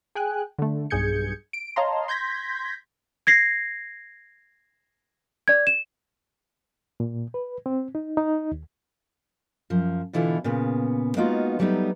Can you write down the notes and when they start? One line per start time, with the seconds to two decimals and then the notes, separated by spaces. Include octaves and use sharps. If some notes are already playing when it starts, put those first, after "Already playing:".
0.15 G#4 G5 G#5 F#6
0.59 D3 A3
0.90 B1 G2 G#4 G6 G#6 C#7
1.53 D7
1.76 C#5 D#5 F5 A5 A#5 C6
2.08 C6 G6 G#6 A#6 B6
3.27 G#6 A#6 C7
5.48 D5 G#6
5.67 E7
7.00 A#2
7.34 B4
7.66 C4
7.95 D#4
8.17 D#4
8.52 D#2
9.70 F#2 F3
10.13 B2 D3 E3 E4 F4 A4
10.44 A#2 C#3 B3
11.17 G#3 A#3 B3 D#4 F4 F#4
11.59 F#3 G3 A3 B3 D4 D#4